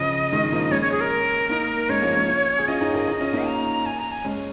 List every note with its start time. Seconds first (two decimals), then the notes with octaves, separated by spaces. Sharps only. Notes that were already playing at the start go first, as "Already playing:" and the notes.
Already playing: C#3 F3 D#5
0.32 D#3 G#3
0.52 F3 A#3
0.71 G#3 C#4 C#5
0.81 C#5
0.92 G#4
1.00 A#4
1.49 A#3 D#4
1.89 G#3 C#4 C#5
2.02 F3 A#3
2.16 G#3 C#4
2.28 C#4 F4
2.58 G#4
2.68 C#4 F4 D#5
2.80 D#4 G#4
2.93 F4 A#4
3.07 D#4 G#4
3.20 C#4 F4
3.33 A#3 D#4
3.47 A#5
3.86 G#5
3.99 A#5
4.11 G#5
4.25 G#3 C#4